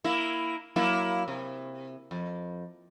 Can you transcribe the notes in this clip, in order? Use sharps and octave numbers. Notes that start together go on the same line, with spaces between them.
A#3 E4
F#3 A#3 E4
C3
F2